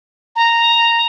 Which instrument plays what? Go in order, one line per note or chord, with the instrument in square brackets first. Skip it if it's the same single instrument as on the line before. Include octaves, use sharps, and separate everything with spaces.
[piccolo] A#5